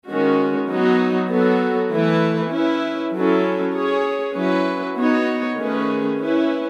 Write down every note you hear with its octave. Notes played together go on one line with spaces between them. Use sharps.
D#3 G#3 C#4 F#4
F#3 B3 D#4 F#4
F#3 B3 F#4 A4
E3 A3 E4 B4
C#4 E4 B4
F#3 C#4 E4 A4
C#4 G#4 C#5
F#3 C#4 E4 B4
B3 D#4 F#4 C#5
D#3 A3 C#4 G#4 B4
C#4 E4 B4